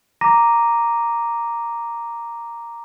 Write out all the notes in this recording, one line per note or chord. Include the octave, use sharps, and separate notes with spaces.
A#5 D6 A#6 D#7